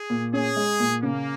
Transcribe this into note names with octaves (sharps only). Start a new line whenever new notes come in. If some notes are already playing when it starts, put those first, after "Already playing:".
Already playing: G#4
A#2
C#4 G#4
G#3
A#2
C#3 A#3